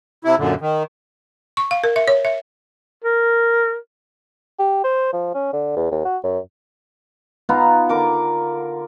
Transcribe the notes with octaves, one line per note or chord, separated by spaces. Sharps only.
C3 E4
F#2 A#2 D3
D#3
C#6
F5
A#4
E5
C#5
E5
A#4
G4
C5
F3
C#4
D3
E2
D#2
F#4
F#2
B3 D#4 F4 A#5
D3 A#4 D6